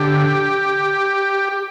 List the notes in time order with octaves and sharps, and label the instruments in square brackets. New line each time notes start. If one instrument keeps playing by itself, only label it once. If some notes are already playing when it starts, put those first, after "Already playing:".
Already playing: [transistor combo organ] D3 G4